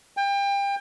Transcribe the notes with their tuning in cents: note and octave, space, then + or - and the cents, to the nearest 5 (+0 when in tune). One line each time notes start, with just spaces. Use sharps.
G5 +30